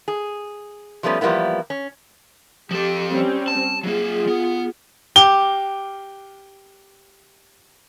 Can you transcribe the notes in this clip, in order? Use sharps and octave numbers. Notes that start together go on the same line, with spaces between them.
G#4
F3 G3 A3 B3 C#4
E2 F3 G3 A#3 B3 E4
C#4
F3 G4 A4
G3 C4 C#4
A5
F#3 A#3 F4 G#4
B3
G4 G7